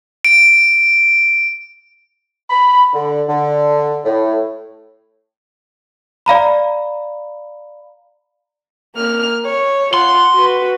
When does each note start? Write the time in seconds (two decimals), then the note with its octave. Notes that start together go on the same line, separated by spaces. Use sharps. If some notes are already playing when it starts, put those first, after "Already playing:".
0.25 D7
2.50 B5
2.94 D3
3.28 D3
4.05 A2
6.26 D5 F5 A#5 B5
8.95 A#3 F6
9.44 C#5
9.94 F4 F#5 C6
10.33 F#4 B4